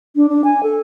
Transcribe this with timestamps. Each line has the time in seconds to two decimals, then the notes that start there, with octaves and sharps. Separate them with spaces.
0.16 D4
0.29 D4
0.44 G#5
0.63 A4